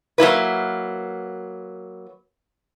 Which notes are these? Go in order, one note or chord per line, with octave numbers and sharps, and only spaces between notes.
F#3 A#3 E4 B4